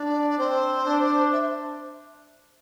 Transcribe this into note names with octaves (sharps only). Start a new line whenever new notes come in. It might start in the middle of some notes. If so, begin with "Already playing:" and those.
Already playing: D4 D5
D5
C4 C5
D4
E5